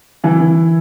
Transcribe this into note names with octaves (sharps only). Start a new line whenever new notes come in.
E3 E4
E3